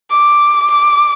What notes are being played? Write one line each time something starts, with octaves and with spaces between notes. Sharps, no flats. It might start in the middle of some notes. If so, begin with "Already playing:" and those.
D6
D6